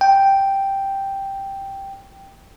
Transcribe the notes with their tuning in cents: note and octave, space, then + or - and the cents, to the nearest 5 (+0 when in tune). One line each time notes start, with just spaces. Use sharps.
G5 +0